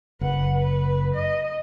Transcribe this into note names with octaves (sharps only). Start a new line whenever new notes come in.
F#1 B4 F#5
B4
D#5